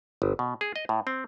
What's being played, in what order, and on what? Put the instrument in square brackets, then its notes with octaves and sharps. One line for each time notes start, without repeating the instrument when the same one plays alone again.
[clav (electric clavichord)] G1
B2
G#4
D#5
A2
C4